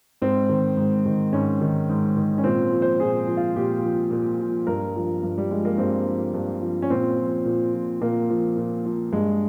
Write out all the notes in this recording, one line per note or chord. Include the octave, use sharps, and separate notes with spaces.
G#2 C4
D#3
G#2
D#3
G#2 C#4
D#3
G#2
D#3
C#4
A#2 C4
F3
C5
A#2 G#4
F3
F4
A#2 G4
F3
A#2
F3
G2 A#4
F3
G2
G3
F3 G#3
A#3
G2 C4
F3
G2
F3
C#4
A#2 C4
F3
A#2
F3
A#2 A#3
F3
A#2
F3
G2 G#3